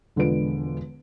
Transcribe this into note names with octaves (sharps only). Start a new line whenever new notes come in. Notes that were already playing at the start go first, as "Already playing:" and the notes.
E1 D3 F3 G#3 B4 D7